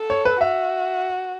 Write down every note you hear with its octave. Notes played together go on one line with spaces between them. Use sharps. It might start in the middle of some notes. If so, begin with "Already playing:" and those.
Already playing: A4
C#5
B4
F#4 E5